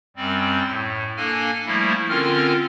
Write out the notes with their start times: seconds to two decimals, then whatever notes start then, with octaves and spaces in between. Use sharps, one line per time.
0.16 F#2 G3 C4 D5
0.66 A2
1.17 A#3 D4 A4 G#5
1.66 F3 G3 A3 A#3 E4
2.09 D3 C4 C#4 F4 A#4 F6